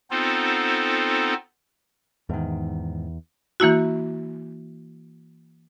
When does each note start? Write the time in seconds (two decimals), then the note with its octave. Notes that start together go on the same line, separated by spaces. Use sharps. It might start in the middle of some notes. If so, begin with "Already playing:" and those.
0.11 B3 C4 D#4 F4 A4 C5
2.29 E2 G#2 D#3
3.60 E3 A#3 E4 F#4